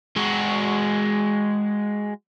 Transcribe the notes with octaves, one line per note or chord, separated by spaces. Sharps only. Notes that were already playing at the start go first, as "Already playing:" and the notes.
G#3 F#4